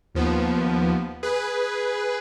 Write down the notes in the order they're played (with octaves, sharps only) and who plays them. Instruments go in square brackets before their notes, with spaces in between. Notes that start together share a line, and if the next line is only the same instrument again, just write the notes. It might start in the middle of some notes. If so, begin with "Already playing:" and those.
[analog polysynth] D#2 F3 B3
G#4 B4